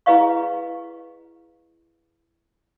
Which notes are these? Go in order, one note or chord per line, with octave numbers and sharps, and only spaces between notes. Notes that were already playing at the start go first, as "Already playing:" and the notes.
E4 G#4 B4 D#5 F5 C#6